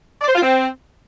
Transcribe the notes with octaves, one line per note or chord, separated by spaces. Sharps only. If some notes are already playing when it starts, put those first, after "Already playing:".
D5
C5
F4
C4